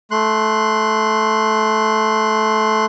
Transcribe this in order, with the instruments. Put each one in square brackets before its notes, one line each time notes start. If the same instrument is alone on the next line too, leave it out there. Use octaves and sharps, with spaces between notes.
[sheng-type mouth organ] A3 C6 F#6